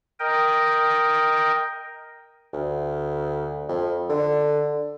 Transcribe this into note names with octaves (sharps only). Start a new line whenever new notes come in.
A#4 D#5 G5
D2
F2
D3